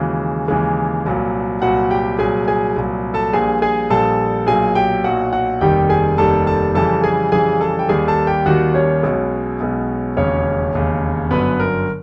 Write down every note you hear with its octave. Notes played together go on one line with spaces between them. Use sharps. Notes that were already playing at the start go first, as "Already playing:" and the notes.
Already playing: D#2 C#3 E3 G#3 F#4
D#2 C#3 E3 G#3
C2 A#2 F#3
C2 A#2 F#3 F#4 F#5
G4 G5
C2 A#2 F#3 G#4 G#5
G#4 G#5
C2 A#2 F#3
A4 A5
A#1 A#2 G3 G#4 G#5
G#4 G#5
A#1 A#2 G3 A4 A5
B1 A#2 F#3 G#4 G#5
G4 G5
B1 A#2 F#3 F#4 F#5
F#4 F#5
F1 D#2 D#3 G3 G4 G5
G#4 G#5
F1 D#2 D#3 G3 A4 A5
A4 A5
F2 C#3 E3 G3 A4 A5
G#4 G#5
F2 C#3 E3 G3 G#4 G#5
A4 A5
G5
D#2 D#3 G3 G#4 G#5
A4 A5
G4 G5
D#2 D#3 G3 F#4 F#5
C#4 C#5
B1 B2 G#3
B1 B2 G#3
E1 D#2 C#3 C#4 C#5
E1 D#2 C#3
G1 F#2 D3 F#3 B3 B4
A#4